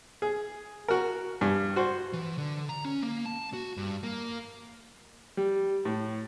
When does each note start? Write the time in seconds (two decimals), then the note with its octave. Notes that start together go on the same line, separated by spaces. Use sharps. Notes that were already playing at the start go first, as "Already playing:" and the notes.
0.22 G#4
0.88 F#4 A#4
1.41 G2
1.76 F#4 C5
2.13 E3
2.38 D3
2.69 A#5
2.85 C#4
3.02 A#3
3.25 A5
3.53 F#4
3.77 G2
4.03 A#3
5.37 G3
5.85 A2